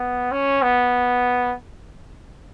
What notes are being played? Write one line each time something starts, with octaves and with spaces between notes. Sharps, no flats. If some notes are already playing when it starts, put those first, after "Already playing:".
Already playing: B3
C#4
B3